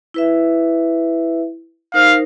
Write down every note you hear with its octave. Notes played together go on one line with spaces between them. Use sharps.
E4 B4 E5
D#4 A#4 C5 F5